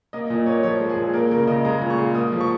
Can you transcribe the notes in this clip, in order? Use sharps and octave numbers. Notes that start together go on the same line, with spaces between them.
A#3 D#5
A#2 D#5
A#3 C#5
F3 C#5
G#3
G#4
A#2
A#3 A#4
C#3 A#4
C#3 D#5
G#3 A#5
A#2
C#6
G#3
A#3 D#6
F3
C#6